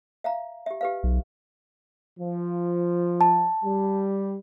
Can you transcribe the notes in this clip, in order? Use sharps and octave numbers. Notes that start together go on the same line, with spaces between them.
E5 F5 A#5
G4 E5
G4 B4 F5
B1
F3
A5
G3